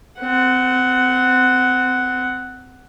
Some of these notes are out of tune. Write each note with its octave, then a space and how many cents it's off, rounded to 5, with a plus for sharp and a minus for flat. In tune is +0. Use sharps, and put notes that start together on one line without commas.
C4 -25 F#5 +5